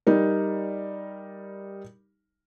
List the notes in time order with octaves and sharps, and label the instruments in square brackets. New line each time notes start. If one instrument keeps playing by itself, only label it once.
[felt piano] G3 D#4 A#4